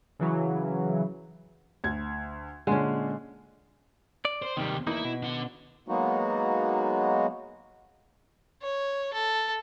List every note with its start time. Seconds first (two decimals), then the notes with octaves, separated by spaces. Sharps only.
0.19 C#3 E3 F#3
1.84 D2 G#6
2.67 A#2 D3 G#3 C#4
4.25 D5
4.42 C5
4.57 D#2 C3 D#3 G3
4.87 E2 A#3 D#4 E4 E5
5.05 B2
5.23 D4 F#5
5.88 F#3 G#3 A#3 B3 D#4 F#4
8.62 C#5
9.13 A4